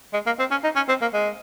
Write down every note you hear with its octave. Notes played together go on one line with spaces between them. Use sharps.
G#3
A#3
C4
C#4
D#4
C#4
C4
A#3
G#3